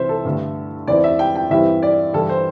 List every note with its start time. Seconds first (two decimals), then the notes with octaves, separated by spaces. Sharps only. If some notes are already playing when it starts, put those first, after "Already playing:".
Already playing: C2 C3 E3 C4 C5 E5
0.09 A4
0.25 G2 D3 A3
0.87 E2 E3 C4 E4 D5
1.04 E5
1.19 G5
1.35 G5
1.50 G2 E3 G3 C4 E4 E5
1.82 D5
2.13 G2 E3 G3 E4 A4
2.29 C5